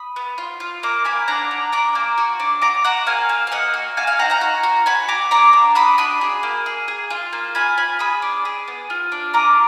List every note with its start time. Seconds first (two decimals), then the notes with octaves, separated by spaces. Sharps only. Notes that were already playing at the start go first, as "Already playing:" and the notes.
Already playing: B5 D#6
0.16 B3
0.38 F4
0.60 F4
0.83 A#3 A#5 D6
1.05 A#3 G#5 B5
1.28 D4 F#5 A#5
1.51 D4
1.72 D4 A#5 D6
1.95 A#3
2.18 F#4
2.40 D4
2.62 F#4 A#5 D6
2.85 F#4 F#5 A#5
3.07 A#3 F5 G#5
3.29 A#3
3.47 F5
3.52 A#3 D#5 F#5
3.74 F#4
3.97 F#4 F5 G#5
4.07 F5 G#5
4.19 D#4 F#5 A#5
4.30 F#5 A#5
4.41 F#4
4.63 F#4
4.86 F#4 G#5 B5
5.08 F#4 A#5 D6
5.31 D4 A#5 D6
5.53 D4
5.75 F#4 B5 D#6
5.98 D4 B5 D#6
6.21 G#4
6.43 A#3
6.66 G#4
6.88 G#4
7.10 F4
7.33 A#3
7.55 F4 G#5 B5
7.78 F4 G#5 B5
7.99 G#4 B5 D#6
8.22 D4
8.45 G#4
8.68 B3
8.90 F4
9.12 D4
9.34 F4 A#5 D6